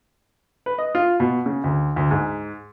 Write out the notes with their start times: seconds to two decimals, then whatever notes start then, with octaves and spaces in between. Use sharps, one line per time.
0.66 B4
0.78 D#5
0.95 F4
1.20 B2
1.46 C#3
1.64 D2
1.96 D2
2.11 G#2